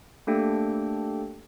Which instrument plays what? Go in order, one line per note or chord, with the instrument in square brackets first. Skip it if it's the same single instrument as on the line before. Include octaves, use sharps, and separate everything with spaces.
[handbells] A3 A#3 D4 G4 A4 G5